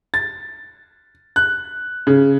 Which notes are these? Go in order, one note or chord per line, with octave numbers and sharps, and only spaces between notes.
A6
F#6
C#3